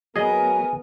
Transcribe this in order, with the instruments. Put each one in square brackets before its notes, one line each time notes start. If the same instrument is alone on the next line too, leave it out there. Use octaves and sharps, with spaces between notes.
[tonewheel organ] F#3 [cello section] B3 A#4 [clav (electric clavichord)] G#4 D#5 [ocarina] G#5